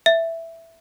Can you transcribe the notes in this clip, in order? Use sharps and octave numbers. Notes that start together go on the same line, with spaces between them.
E5